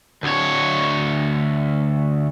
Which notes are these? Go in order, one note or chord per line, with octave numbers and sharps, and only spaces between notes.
D2 C#5